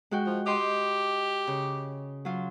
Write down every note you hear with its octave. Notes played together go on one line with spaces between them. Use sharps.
G#3 F#4 G5
F3
G4 D#5 G5 C6
C#3
F#3 F4